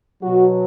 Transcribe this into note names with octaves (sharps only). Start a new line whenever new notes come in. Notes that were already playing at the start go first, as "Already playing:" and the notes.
B2 F#3 F#4